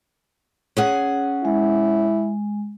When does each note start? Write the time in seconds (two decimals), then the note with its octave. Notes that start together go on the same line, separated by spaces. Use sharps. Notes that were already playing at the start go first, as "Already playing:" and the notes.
0.77 C#4 G#4 F#5
1.45 G#3 E4